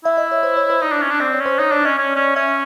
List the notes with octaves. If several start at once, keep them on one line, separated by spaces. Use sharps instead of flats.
E4 E5
D#5
C#5
C5
C#5
C5
D#4 D5
D4
C#4
D4
C4 D5
C#5
C#4
C5
D#4 C#5
D4 D5
C#4 D#5
C#4
C#4
C#4 E5